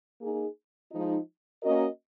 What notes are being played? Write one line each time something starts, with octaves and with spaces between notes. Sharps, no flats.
A#3 D#4 G#4
F3 G#3 D#4
A#3 C#4 F#4 A#4 D#5